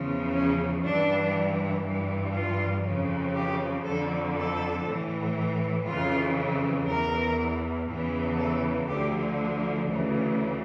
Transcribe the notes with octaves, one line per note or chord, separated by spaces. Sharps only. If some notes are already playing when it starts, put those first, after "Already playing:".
Already playing: E2 C#3 F3
C#4
G2 E3 D4
G2 E3
F4
F2 C#3 F3
G4
F2 D3 F3 A4
A4
A2 E3
F2 C#3 E3 F4
E2 E3 A#4
E2 C#3 E3
A4
D2 D3 F3 G4
D2 C#3 E3